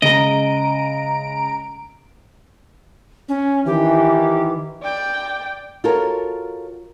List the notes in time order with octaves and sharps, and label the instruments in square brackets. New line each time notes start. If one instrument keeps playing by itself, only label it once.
[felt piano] C#3 G#3 [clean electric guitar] D#5 [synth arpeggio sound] A#5 D7
[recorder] C#4
[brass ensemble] D#3 E3 [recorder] G4
[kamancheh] D5 G5
[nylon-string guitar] F4 F#4 A4 A#4 C#5